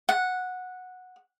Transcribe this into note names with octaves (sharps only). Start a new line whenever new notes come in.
F#5